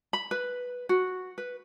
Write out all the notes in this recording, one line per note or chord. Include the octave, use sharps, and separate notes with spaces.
B5
B4
F#4
B4